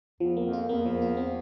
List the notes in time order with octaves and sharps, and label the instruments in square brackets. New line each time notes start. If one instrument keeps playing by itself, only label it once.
[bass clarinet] E2 [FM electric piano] F3
[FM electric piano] A#3
[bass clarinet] F2
[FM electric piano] F4
[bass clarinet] E2 [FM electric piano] A#3
[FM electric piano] F3
F4
C4